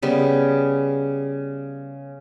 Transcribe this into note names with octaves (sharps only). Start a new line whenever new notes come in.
C#3 G3 B3